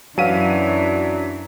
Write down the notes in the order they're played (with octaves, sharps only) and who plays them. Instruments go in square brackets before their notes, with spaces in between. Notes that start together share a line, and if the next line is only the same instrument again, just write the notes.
[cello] F#2 E3 [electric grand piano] F#3 D#7 [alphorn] D4 [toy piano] B4 F5 G#5